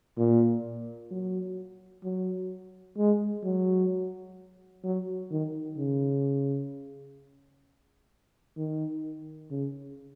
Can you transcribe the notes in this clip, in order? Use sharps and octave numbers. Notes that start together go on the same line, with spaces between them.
A#2
F#3
F#3
G#3
F#3
F#3
D#3
C#3
D#3
C#3